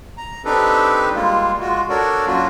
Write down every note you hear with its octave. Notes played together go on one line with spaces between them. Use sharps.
A#5
C4 D4 D#4 G4 A4 B4
G3 G#3 A#3 F4
G#3 F4 F#4
D4 F#4 A4 A#4 C#5 D5
F#3 A#3 C#4 D4 F4 F#4